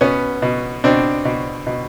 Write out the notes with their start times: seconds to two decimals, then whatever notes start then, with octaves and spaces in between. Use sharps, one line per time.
0.01 B2 B3 C#4
0.42 B2
0.84 B2 C4 D4
1.25 B2
1.67 B2